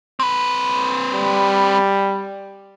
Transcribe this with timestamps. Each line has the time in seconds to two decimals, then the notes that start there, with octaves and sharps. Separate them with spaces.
0.20 C4 B4
1.14 G3